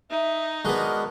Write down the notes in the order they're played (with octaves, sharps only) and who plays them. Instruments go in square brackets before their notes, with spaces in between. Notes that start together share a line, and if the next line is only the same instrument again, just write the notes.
[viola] D#4 [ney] E5
[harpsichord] G#3 B3 [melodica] D4 F#4 B4 [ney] A#4